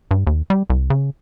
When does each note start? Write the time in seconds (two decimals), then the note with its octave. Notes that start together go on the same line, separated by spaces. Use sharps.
0.11 G2
0.27 D#2
0.50 G3
0.70 C2
0.90 C#3